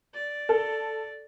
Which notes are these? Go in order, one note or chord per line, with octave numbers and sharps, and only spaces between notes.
D5
A4